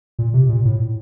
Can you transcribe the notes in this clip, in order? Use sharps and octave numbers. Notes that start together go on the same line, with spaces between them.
A#2
C3
A#2
A2